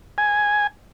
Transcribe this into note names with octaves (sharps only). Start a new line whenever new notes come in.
G#5